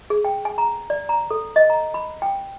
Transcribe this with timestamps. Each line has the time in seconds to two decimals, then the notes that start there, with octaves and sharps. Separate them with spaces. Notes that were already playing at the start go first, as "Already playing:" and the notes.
0.10 G#4
0.25 G5
0.45 G#5
0.58 A#5
0.90 D5
1.09 A#5
1.31 A4
1.56 D#5
1.70 A#5
1.94 B5
2.22 G5